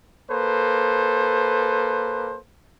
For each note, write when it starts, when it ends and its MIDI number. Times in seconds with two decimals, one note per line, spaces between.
0.31 2.39 58
0.31 2.39 69
0.31 2.39 71
0.31 2.39 72